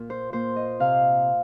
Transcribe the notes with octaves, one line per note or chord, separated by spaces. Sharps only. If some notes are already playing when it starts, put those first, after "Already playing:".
Already playing: A#2
C5
A#2 C5
D#5
C3 F5